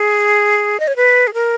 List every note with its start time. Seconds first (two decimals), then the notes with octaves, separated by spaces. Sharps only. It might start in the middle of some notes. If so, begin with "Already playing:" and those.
Already playing: G#4
0.80 D#5
0.88 C#5
0.96 B4
1.27 G#4
1.34 A#4